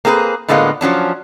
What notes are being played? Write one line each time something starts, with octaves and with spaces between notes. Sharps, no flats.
A#3 C4 G#4 A4 B4
A2 D3 G#3 A#3 B3 F4
F3 F#3 C#4 D4